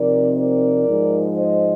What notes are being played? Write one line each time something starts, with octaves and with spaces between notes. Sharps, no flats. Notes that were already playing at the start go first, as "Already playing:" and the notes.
Already playing: C3 F3 C4 D#4 A#4 D5
A#4 D5
G#2 F3 G#3 D#4
C5 D#5